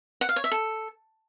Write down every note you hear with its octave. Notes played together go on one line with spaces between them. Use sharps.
F#5
F5
C#5
E5
A4